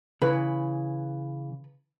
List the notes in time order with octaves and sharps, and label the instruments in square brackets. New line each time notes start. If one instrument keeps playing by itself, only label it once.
[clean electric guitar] C#3 E3 [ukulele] B4